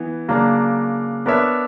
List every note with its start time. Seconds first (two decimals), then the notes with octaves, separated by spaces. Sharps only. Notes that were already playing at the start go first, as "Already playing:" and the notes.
Already playing: E3 B3
0.28 C#3 F#3 A#3 D4
1.26 B3 D4 A#4 C#5 E5